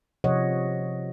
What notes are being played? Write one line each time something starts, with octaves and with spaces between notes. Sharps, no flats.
C3 F3 C#5 D#5 F#5